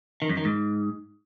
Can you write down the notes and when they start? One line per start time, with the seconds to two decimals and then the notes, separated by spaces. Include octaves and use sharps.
0.22 D#3
0.29 F#2
0.37 D#3
0.45 G#2